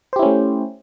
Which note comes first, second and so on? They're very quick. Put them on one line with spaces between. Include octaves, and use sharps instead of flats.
C5 G4 E4 C#4 A3